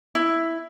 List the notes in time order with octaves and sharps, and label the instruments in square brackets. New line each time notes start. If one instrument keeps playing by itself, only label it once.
[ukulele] E4